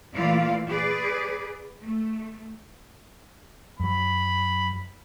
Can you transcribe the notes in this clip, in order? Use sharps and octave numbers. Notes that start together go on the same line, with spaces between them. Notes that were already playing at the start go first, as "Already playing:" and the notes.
A#2 E3 A3 F4 D5 F5
G#4 B4 D5
A3
F#2 F#3 B5